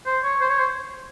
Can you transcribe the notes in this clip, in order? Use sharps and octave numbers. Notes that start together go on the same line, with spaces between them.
C5
C#5
C5
C#5
C5